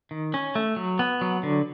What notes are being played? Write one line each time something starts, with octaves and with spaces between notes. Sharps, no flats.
D#3
C#4
A3
F#3
B3
F#3
D3